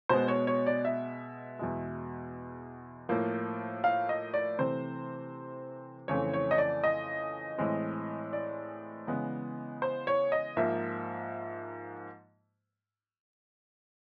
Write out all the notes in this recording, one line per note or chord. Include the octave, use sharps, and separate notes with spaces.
B2 G#3 B3 C5
C#5
C#5
D5
E5
E2 B2 G#3
A2 F3 A#3
F5
D#5
D5
C3 E3 A3 C4 C5
F2 C#3 E3 A3 C4 C#5
C#5
D#5
D5
D#5
A2 E3 G#3 C4
D5
C#3 E3 G#3 B3
C5
C#5
D#5
G#2 F3 A#3 E5